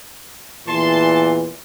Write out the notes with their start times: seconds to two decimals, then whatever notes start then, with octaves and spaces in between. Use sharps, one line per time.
0.67 E2 A#2 E3 A5 C6